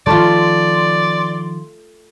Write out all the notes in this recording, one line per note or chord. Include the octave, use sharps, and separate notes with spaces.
D#3 F3 A3 F4 D5 C6